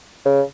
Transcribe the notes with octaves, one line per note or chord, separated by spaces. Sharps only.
C#3